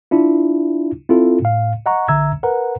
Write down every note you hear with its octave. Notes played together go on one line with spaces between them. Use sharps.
D4 E4 F4
C4 E4 F4 A4
A2 F5
D#5 F#5 A#5 C#6
A#1 D3 E5 A#5 E6 G#6
A#4 B4 F#5 A#5